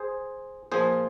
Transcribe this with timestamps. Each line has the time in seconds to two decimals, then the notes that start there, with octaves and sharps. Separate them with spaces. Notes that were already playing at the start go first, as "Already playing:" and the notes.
Already playing: G#4 C5
0.72 A#2 F3 G#4 C5